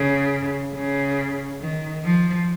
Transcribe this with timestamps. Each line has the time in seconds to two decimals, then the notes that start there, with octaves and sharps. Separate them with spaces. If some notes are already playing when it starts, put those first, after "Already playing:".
Already playing: C#3
0.74 C#3
1.61 D#3
2.05 F3